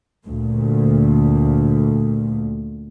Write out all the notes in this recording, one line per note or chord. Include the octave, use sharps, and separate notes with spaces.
D2 A#2